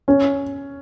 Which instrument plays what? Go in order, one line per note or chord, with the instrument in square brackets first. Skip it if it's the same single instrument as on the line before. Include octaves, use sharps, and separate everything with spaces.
[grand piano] C#4